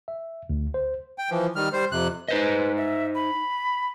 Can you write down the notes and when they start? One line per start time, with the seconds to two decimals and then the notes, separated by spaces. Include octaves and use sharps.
0.08 E5
0.50 D2
0.74 C5
1.18 G5
1.31 E3 F3
1.56 D#3 G3 F6
1.73 G3 C5
1.92 F2 C3 F#6
2.28 D#4 B4 C5 D#5
2.77 E5
3.15 B5